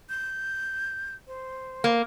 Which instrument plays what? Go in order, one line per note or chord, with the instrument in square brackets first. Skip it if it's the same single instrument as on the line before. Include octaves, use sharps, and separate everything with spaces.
[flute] G6
C5
[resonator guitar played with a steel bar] A#3